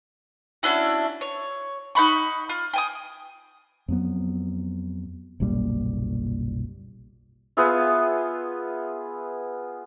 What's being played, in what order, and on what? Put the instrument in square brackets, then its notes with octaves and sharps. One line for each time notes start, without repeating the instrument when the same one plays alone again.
[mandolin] C#4 D4 E4 F#4
C#5
D#4 F#5 B5 C#6
F4
G5 G#5 D#6
[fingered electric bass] F2 F#3 B3
F#1 B1 A#2 G3
[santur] B3 F4 G#4 E5